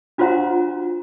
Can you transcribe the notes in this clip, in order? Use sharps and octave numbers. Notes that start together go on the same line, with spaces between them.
D4 F4 F#4 C5 F#5 A#5